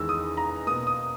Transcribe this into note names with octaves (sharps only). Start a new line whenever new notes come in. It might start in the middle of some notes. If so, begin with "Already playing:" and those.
Already playing: E2 D#3 G#3 E6
D#6
A#5
B2 A#3 D#6
D#6